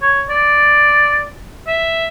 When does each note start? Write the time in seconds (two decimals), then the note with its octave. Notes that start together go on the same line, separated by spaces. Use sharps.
0.02 C#5
0.30 D5
1.67 E5